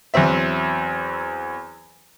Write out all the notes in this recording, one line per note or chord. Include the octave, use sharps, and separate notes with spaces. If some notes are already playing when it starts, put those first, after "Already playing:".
E2 F#3 C4 E5